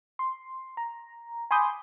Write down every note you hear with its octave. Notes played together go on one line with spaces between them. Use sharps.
C6
A#5
G#5 B5 C6 D6 D#6 G6